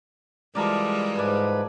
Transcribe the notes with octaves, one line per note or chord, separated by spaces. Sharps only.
E3 F3 G3 G#3 A#4 D5
G#2 B4 D5 G#5